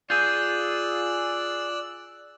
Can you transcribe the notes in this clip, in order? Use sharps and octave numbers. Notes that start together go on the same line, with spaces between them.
F4 G#4 D5 E6 F#6 G6